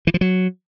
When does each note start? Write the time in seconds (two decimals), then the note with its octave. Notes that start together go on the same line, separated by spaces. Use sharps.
0.07 E3
0.14 F3
0.21 F#3